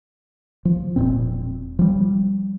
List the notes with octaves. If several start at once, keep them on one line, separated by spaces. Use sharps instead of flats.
F3
E1 B1 A#2 C4
F3 G3